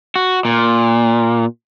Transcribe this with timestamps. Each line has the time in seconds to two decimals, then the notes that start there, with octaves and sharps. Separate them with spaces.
0.16 F#4
0.45 A#2